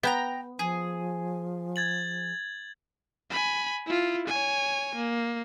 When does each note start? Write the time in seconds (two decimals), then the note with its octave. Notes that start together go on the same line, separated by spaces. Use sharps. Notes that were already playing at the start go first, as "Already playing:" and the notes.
0.03 B3 E5 G5 A#5
0.59 F3 G#4
1.76 G#6 A6 F#7
3.30 G#5 B5
3.87 E4 F4
4.27 C#5 G#5
4.95 A#3